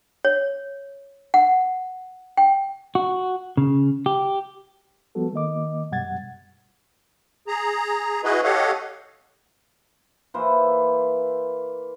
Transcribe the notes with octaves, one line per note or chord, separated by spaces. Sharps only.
C#5
F#5
G5
F#4
C#3
G4
F3 G3 B3 F#4 A4
D#3 A#3 D#5 D6
F#2 B2 G3 F#5 G#6 A6
G#4 A#5
E4 F#4 G#4 B4 D#5
G4 A4 C#5 D#5 F5 F#5
E3 A#3 E4 C5